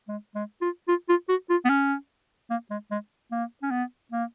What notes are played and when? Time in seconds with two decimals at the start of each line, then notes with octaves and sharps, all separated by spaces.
0.08 G#3
0.35 G#3
0.61 F4
0.88 F4
1.09 F4
1.29 F#4
1.50 F4
1.65 B3
1.70 C#4
2.50 A#3
2.71 G#3
2.91 G#3
3.32 A#3
3.63 C#4
3.71 B3
4.12 A#3